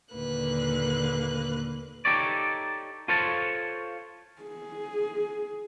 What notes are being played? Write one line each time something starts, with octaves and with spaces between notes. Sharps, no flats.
D#2 A#2 D3 A#3 B4 F#6
D#4 G4 A4 C#5 D5
F4 A4 C5 C#5 F5 A5
G#4